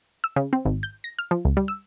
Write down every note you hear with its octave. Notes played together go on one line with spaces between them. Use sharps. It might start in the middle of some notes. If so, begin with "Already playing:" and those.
E6
C#3
C4
G#1
G6
A#6
F6
F3
C#2
G3
E6